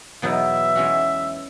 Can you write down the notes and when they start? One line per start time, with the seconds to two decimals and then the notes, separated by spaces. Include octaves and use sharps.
0.22 E2 B2 F#3 B3 D#4 E5
0.76 E3 G#3 C#4 F#4